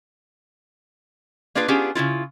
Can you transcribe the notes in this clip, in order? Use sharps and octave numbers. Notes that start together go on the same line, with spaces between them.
A#3 D4 F4 G#4 B4 F5
B3 C#4 D4 F4 G4 G#4
C#3 A3 E4 F4